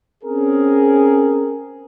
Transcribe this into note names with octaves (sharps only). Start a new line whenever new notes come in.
C4 C#4 G#4 A#4